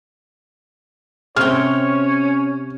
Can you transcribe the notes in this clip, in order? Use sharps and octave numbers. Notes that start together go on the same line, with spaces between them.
C3 C#4 C#5 G5 F6